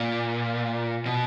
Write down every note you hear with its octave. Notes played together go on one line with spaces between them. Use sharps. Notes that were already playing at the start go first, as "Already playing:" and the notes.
Already playing: A#2
B2